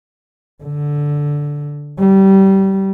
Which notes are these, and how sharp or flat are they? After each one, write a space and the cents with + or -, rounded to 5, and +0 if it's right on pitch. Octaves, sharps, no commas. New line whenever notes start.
D3 -5
G3 -20